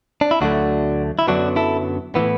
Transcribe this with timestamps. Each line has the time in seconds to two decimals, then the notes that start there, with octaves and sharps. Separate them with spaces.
0.21 D4
0.31 E4
0.41 D2 D3 F#3 A3 D4 F#4
1.19 E4
1.27 F#2 D3 F#3 B3 D4 F#4
1.56 E4 A4
2.15 A2 E3 B3